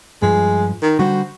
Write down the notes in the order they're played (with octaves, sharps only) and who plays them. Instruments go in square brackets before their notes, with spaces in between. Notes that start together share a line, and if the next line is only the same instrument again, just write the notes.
[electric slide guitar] G2 F3 [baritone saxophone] G#3
[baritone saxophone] D#3
[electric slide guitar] D3 G3 C5 [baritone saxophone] F#4